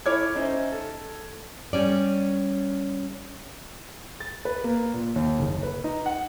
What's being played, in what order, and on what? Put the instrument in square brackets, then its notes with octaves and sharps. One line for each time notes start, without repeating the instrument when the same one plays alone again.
[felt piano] E4 A4 C#5 D6 F6 G#6
C#4 D#4 C5 E5
A4
[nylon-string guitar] G3 C#4 D5
[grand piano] A6
B4
A#3
A#2
D#2
F#1
B4
D#4
F#5